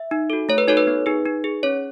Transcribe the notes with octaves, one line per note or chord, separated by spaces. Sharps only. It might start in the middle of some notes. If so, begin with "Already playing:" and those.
Already playing: E5
D#4
F#4 A4
A3 C#5
B4
D#4 F#4 A4 C#5
B4
B3
D#4 G#4
D#4
G#4
C#4 C#5